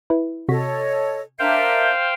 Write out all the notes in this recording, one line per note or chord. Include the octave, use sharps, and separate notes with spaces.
E4 B4
C3 F#4 A4 C#5 D#5 B6
D4 A#4 C5 E5 F5 G5